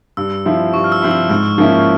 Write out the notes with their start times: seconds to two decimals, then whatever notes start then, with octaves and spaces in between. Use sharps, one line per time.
0.17 G2 E6
0.45 F3 C4 E4
0.73 G2 C#6
0.84 F6
0.92 E6
1.02 F3 C4 E4
1.11 E6
1.30 G#2 F6
1.58 F3 A#3 C#4 E4